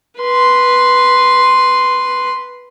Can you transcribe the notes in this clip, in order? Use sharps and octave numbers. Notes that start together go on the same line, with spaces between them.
B4 C6